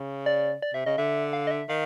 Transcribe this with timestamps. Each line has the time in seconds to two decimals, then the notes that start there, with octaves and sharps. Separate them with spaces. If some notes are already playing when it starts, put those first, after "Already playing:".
Already playing: C#3
0.26 D5
0.62 D5
0.73 C3 E5
0.86 C#3 D#5
0.98 D3 E5
1.33 F5
1.47 D#5
1.51 E5
1.69 D#3 F5